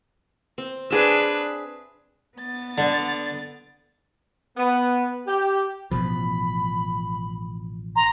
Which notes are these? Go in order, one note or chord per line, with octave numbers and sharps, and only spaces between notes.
C4
D4 G#4 B4 E5
B3 A6
D3
B3
G4
A1 B2 F3 B5
A#5 C6